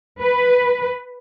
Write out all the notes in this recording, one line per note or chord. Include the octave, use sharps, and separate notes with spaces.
B4